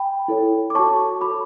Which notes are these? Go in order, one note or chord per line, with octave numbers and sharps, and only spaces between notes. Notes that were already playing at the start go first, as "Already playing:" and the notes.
Already playing: G5 B5
E4 A4 C#5
D6
F#4 A4 C#5 A5 C#6
F#4 A4 C#5 B5 D6